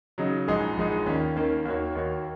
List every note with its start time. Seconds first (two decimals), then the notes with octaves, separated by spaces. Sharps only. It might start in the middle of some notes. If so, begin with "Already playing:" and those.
0.18 C#3 F#3 D#4
0.48 A#1 G#2 G#3 D#4 G#4
0.77 A#1 G#2 G#3 D#4 G#4
1.06 D#2 D#3 A#3 C#4
1.36 D#2 D#3 A#3 C#4
1.65 D#2 D#3 A#3 F#4 C#5
1.95 D#2 D#3 A#3 F#4 C#5